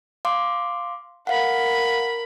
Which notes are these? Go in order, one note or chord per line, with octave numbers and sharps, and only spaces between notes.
F5 C6 D6
A#4 F5 F#5 B5